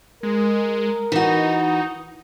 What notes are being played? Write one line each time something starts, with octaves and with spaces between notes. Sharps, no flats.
G#3 A#4
E3 D#4 F#4